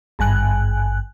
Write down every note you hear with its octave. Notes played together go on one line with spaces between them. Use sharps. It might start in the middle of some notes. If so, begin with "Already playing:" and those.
G#1 G2 G#5 F#6